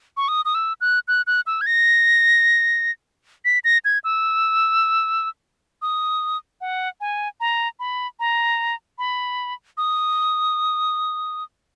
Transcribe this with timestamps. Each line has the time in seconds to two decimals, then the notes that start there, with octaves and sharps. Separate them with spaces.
0.17 C#6
0.28 D#6
0.45 D#6
0.55 E6
0.81 F#6
1.08 F#6
1.27 F#6
1.47 E6
1.61 G#6
1.66 A#6
3.45 B6
3.64 A#6
3.85 G#6
4.04 E6
5.82 D#6
6.61 F#5
7.01 G#5
7.40 A#5
7.80 B5
8.20 A#5
8.98 B5
9.77 D#6